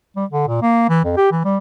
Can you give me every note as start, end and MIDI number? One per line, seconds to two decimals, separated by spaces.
0.16 0.25 55
0.30 0.48 50
0.48 0.61 46
0.62 0.84 58
0.89 1.02 52
1.05 1.15 41
1.17 1.31 67
1.31 1.42 52
1.45 1.57 55